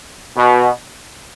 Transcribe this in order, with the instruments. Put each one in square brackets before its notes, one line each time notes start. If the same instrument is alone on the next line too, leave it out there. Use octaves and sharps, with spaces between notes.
[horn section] B2